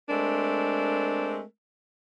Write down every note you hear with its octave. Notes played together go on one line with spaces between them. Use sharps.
G#3 A3 C4 D4 A#4